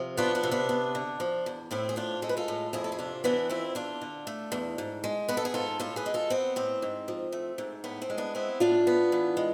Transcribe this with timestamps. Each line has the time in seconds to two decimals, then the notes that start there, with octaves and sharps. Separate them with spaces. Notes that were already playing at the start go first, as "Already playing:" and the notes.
Already playing: C3 F3
0.17 B3 D4 F4
0.35 D4 F4
0.43 C3
0.51 B3 D4
0.69 B3
0.95 D3
1.20 F3
1.46 E2
1.71 A2 C4 E4
1.89 G#4
1.96 F3 D4 F4
2.22 G#3 A4
2.29 B4
2.37 F4 A4
2.48 A2
2.73 F2 E4 G#4
2.84 A4
2.92 G#4
2.99 C3 D4 F4
3.24 E3 B3 D4
3.49 F2 C4 E4
3.75 E2 D4 F4
4.01 D3
4.27 A3
4.52 E2
4.78 G#2
5.04 G#3
5.29 B3 B4
5.37 A4
5.45 G#4
5.54 G#2 F4 A4
5.80 A2 F4 A4
5.96 G#4 B4
6.06 G#3
6.14 F4 A4
6.30 B3 C4
6.56 A2 C4
6.82 G#2
7.08 F3
7.32 A3
7.58 G#2
7.84 A2 B3
8.02 C4
8.10 G#3
8.18 B3 D4
8.35 B3 C4 E4
8.60 A2 D4 F4
8.87 B3
9.12 E3
9.37 G#3